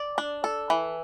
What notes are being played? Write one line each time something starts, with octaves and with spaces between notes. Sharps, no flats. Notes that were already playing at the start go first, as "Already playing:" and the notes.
Already playing: D5
D4
A4
E3